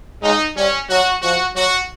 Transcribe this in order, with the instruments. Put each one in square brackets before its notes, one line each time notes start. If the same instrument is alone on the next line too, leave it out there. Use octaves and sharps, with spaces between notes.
[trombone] G#3 [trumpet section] D#4
[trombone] G3 [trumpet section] C#4
[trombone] F#3 [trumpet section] F#4
[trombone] F3 [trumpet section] F#4
[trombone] F#3 [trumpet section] F#4